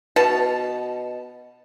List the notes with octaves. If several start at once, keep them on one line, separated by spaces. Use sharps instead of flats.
B2 A5